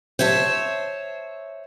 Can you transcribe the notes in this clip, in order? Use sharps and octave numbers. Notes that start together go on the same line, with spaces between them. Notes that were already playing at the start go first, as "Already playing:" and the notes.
C5 C#5 E5 A5